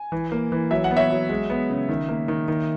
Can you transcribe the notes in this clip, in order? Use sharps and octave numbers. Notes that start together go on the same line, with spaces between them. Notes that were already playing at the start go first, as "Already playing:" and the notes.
Already playing: G#5
E3
A#3
E3
F#3 E5
F#5
B3
C#5 E5
F#3
G#3
B3
C#3
D#3
A#3
D#3
D#3